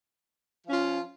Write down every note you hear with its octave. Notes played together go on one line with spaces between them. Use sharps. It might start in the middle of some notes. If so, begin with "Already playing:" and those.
F3 C#4 F4